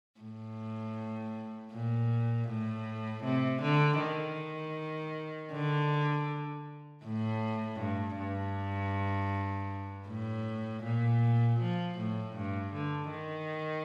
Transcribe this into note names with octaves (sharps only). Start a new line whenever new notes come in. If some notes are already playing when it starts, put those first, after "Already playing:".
A2
A#2
A2
C3
D3
D#3
D3
A2
G2
G2
A2
A#2
F3
A2
G2
D3
D#3